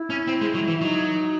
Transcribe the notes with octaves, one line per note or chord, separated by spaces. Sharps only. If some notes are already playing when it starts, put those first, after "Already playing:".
Already playing: E4
C#4
C4
G#3
F#3
E3
F#3 D#4